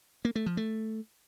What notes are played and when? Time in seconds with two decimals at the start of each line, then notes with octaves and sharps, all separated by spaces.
0.25 A#3
0.36 A3
0.46 F3
0.57 A3